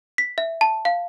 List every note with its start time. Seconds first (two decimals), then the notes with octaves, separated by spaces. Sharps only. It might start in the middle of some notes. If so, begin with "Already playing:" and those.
0.18 B6
0.38 E5
0.61 A5
0.85 F5